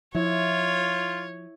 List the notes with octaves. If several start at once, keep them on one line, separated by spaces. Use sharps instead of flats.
F3 E4 F4 C#5